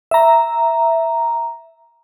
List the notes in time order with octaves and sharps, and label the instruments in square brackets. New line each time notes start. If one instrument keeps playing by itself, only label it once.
[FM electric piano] E5 A#5